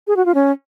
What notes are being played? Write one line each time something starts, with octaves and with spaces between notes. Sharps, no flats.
G#4
F#4
F4
C#4